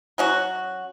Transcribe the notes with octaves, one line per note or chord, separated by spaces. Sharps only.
F#3 C#4 F#4